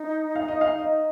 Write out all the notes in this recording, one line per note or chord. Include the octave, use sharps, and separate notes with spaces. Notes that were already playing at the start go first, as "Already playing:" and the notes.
Already playing: D#4
F5
D#5
F5
D#5